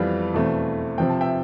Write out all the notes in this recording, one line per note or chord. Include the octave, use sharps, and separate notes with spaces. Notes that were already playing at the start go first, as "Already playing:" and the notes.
Already playing: F2 E3 G3 B3 D5 F5
E2 B2 A3 C4
C3 F3 C4 G5
A5
E5 G5